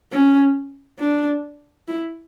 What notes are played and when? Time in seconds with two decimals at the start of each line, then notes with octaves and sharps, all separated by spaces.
0.12 C#4
1.00 D4
1.88 E4